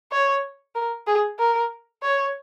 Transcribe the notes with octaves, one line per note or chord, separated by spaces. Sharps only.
C#5
A#4
G#4
A#4
C#5